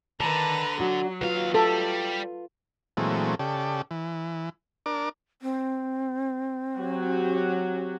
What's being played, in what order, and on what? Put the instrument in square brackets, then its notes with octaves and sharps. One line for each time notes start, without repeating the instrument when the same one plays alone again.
[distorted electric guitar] D3 [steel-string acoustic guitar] D#3 A5 [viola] B4 A#5
[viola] F#3 [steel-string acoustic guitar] D4 F#4
[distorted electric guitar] D#2 F5 [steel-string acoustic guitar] F4 B4
[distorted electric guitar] G3 G4 [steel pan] A4
[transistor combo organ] A#2 E3 F#3 G#3 A3 C4
C#3 G4 A4 D5
E3
D4 A#4 D6
[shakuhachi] C4
[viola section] F#3 F#4 G4